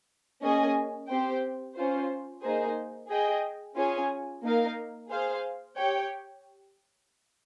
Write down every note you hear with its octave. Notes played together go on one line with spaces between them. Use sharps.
A#3 C#4 G#4 D#5 G#5
C4 G4 C5 G5
C#4 F4 C5
A#3 D#4 G#4 C5
G#4 D#5 G5
C#4 F4 G#4 C#5 G#5
A#3 D#4 A#4 F5
G#4 C5 F5
G4 C#5 G5